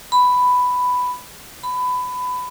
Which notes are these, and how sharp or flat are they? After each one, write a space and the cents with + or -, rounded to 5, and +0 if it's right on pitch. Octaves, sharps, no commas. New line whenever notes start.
B5 +5
B5 +20